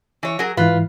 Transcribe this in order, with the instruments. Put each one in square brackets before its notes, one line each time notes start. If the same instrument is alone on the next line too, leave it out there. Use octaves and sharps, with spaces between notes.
[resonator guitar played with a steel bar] E3 C#5
F#3 G#4 A#4
[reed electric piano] G#2 E3 E4 [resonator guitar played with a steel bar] F4 B4